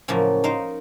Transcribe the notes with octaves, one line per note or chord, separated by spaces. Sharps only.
A2 C#3 F3 F#3 A#3
D#4 A#4 C5 F5